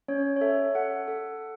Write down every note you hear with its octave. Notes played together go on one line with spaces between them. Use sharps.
C#4 C#5
C#5
A4 E5
A4 F#5
A4